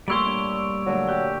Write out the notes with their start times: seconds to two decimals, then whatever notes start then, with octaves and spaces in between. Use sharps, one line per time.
0.08 A#2 G3 A3 C#5 C6 C#6 E6 D7
0.26 D4
0.86 A#2 D3 F#3 A3
1.09 G4 F#6